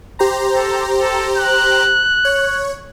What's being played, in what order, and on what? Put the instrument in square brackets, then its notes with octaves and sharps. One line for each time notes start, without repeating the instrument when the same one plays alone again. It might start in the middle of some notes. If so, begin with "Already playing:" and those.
[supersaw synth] G4 C5 A#5
[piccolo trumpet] A4
A4
F#6
[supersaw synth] C#5